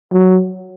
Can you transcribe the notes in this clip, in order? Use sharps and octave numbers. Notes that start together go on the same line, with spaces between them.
F#3